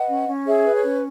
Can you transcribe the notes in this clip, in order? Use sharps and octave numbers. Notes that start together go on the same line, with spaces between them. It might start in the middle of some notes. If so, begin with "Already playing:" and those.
Already playing: B4 D#5 F#5
C#4
C#4
G#4 C#5 E5
B4
C#5
C#4